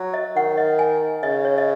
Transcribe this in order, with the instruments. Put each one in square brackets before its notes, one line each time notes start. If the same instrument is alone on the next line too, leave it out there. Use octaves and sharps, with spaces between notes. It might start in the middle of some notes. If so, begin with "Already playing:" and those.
Already playing: [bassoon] F#3
[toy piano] D#5
[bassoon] D#3 [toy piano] F#5
[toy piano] D#5
G#5
[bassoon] C#3 [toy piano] D#5
[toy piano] C#5
D#5